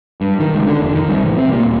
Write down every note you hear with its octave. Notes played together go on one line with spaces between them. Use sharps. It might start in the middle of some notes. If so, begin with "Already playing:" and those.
G2
D#3
C#2
D3
F1
D#3
C2
A1
C3
A#2
D#1